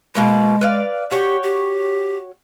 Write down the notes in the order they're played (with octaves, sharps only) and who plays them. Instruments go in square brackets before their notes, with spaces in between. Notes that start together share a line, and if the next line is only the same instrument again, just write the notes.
[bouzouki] B2 A#3 B4 [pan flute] G#3
[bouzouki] B4 D5 F5
[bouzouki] F#4 C#5 G5 [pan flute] G4
[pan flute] G4